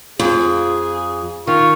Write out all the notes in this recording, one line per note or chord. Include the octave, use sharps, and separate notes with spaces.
F2 F4 G#4
D#3 F4 C#6